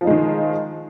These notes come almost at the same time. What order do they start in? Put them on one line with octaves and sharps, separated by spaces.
F3 D#4 G#3 D#3